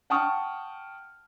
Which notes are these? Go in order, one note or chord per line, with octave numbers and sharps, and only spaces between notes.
F#5 G5 A5 C#6 D#6 F6